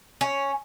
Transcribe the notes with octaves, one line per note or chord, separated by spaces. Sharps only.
C#4